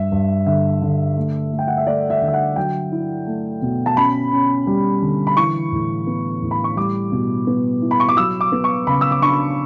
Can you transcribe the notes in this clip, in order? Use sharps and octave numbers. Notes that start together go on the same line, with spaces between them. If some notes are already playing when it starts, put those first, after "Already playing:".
Already playing: G2 E5
G2
D3 E5
D3
A3
A3
G5
F#5
E5
A3 D5
E5
D3
E5
F#5
F#3 G5
E4
A3
B2
A5
C#4 B5
C#4
G3
D3
B5
E3 C#6
A2
B3
A2
B5
C#6
G3 D6
B2
B3
E4
B5
C#6
D6
F#3 E6
D6
B3
C#6
C#3 B5
E6
D6
D4 C#6